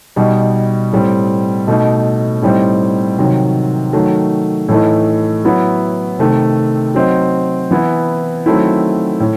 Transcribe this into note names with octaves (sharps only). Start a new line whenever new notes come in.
B2 G3 D#4
A2 G3 C4
B2 A3 D#4
A2 G3 C4 D#4
C3 D#3 F#3
D#3 F#3 A3
A2 E3 A3 D#4
F#3 B3 E4
C3 D#3 A3
F#3 C4 D#4
E3 B3 E4
D#3 F#3 A3 C4 E4
A2